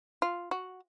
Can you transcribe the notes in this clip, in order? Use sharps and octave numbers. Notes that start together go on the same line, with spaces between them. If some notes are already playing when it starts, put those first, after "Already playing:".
F4
F#4